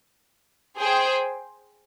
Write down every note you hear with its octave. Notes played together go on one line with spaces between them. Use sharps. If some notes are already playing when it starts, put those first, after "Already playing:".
G#4 C5 G5